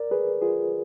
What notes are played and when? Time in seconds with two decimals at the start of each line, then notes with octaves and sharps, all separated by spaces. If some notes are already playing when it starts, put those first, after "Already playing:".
Already playing: A#4 D5
0.11 G#4 B4
0.42 F4 G#4